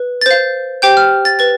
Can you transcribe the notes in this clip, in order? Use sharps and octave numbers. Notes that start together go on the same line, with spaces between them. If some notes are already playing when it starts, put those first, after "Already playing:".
Already playing: B4
A6
C5 F5 G6
G4 C5 G5 G6
F6
A6
B4 A6